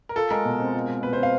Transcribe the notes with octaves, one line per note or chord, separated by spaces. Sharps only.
A#4
F4 A4
G#3 A#4
B2
C4
F4
G#3
B2 B4
C4 C5
F5